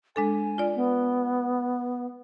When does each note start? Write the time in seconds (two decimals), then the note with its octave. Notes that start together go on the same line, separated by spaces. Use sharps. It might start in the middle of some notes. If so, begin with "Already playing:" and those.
0.16 G#3 D4 A4 G#5
0.58 F4 D5
0.76 B3